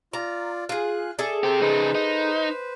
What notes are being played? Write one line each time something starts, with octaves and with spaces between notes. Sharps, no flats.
F4 D5 A#5
F4 G#4 F#6
G#4 A4 D5 E5
C4 G4 C5
C#3 D#4 B4 C5
D#4